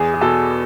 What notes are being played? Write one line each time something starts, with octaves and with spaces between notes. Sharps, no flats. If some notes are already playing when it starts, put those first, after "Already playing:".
Already playing: E2 G#4
G#4
B2 A4